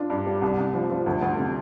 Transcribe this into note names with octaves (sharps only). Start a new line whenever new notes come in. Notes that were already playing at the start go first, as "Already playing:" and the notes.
Already playing: D4 F4
G2
G3
C2
C2
F3
F3
D2
D2
C3